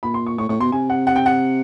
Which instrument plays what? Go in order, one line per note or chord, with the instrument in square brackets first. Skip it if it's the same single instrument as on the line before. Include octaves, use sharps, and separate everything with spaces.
[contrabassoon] A#2 [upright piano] B5
[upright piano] C6
C#6
[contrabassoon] A2 [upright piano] C#6
[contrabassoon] A2 [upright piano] C#6
[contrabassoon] B2 [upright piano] C6
[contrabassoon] C3 [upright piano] G#5
[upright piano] F#5
F#5
G5
F#5